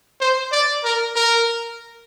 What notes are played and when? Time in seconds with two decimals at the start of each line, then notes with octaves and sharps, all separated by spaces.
0.21 C5
0.52 D5
0.84 A#4
1.16 A#4